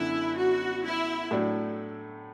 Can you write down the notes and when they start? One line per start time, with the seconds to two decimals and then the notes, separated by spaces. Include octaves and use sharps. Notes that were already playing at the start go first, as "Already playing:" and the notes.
Already playing: F#2 D3 B3 E4
0.38 F#4
0.84 E4
1.31 A2 F#3 A3 D4